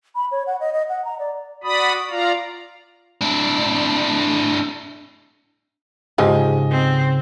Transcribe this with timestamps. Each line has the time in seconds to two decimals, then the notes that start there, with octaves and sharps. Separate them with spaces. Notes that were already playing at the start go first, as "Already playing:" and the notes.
0.15 B5
0.32 C#5
0.47 F#5
0.60 D#5
0.73 D#5
0.89 F#5
1.05 A#5
1.19 D5
1.64 F#4 D5 B5 D#6
2.11 F4 D5 F5 A#5
3.21 D4 E4
6.18 G#2 C#3 F3 G#3 G4 D#5 G#5
6.71 C4